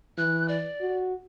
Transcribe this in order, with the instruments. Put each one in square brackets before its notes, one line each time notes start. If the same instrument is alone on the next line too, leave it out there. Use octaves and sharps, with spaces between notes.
[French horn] E3 [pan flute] F#6
[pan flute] D5
[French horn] F#4